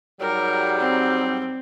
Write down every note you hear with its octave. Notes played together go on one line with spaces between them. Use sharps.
G#2 F#3 G3 A#4
C4